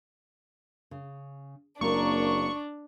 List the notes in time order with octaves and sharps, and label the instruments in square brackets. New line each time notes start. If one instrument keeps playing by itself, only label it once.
[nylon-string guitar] C#3
[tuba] F#1 [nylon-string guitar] A#3 C4 A#4 [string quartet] D4 [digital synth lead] C#6